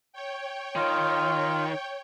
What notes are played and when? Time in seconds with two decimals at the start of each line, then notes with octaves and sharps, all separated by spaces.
0.13 C#5 G5
0.76 D#3 F4